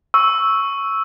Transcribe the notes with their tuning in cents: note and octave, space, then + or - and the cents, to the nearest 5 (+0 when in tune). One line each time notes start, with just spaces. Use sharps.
C#6 +0 E6 -5